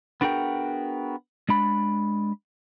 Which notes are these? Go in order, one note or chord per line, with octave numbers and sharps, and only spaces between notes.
B3 D4 F#4 G#4 A#4 G5
G#3 D4 B5